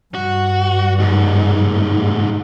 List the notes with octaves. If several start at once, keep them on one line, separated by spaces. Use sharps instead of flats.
G2 F#4
D#2 G#2